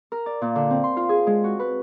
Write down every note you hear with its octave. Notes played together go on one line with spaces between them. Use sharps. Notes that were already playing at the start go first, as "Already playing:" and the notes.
A#4
D5
A#2
D3
C4
C6
F4
G#4
G#3
F#4
B4